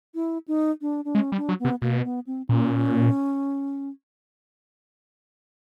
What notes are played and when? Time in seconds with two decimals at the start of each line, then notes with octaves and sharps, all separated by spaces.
0.15 E4
0.48 D#4
0.81 D4
1.05 D4
1.15 G#3 C#4
1.32 G3
1.37 D4
1.49 F#3
1.60 B3
1.65 C3
1.82 B2 A#3
2.04 B3
2.27 C4
2.49 A#2 C#4